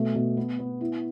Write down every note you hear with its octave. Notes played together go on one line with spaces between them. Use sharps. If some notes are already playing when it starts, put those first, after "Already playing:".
Already playing: B2 A3
B2
B3
B3
E4